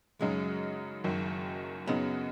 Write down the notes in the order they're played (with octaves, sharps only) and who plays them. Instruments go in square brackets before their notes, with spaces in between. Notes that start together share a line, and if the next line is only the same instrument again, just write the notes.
[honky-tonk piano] F#2 C#3 F#3 D#4 [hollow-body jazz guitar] G#3
[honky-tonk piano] F#1 F#2 D#3
[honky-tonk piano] F#2 C#3 F#3 D#4 [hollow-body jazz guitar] B3